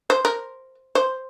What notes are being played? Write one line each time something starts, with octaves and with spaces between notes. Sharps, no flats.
C5
A#4
C5